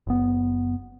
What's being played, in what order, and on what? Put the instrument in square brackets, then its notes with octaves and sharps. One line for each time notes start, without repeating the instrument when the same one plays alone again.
[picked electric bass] F#1 B3